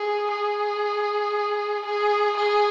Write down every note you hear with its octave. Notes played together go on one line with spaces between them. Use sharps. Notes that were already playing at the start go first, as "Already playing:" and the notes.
Already playing: G#4
G#4
G#4
G#4